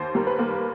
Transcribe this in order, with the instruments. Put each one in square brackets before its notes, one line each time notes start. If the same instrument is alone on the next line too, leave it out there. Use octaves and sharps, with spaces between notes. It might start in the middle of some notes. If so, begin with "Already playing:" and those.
Already playing: [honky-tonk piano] D#2 C5
G3 A#4
B4
A#3